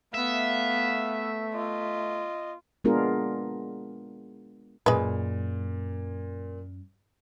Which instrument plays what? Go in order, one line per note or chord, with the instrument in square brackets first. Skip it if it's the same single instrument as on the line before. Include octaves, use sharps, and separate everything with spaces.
[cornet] A3 [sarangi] B3 [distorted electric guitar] E5 [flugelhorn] F5
[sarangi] F4 [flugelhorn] D#5
[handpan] G#3 B3 D4 F4 G#4 A#4
[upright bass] F#2 [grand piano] A#2 [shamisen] G#3 B4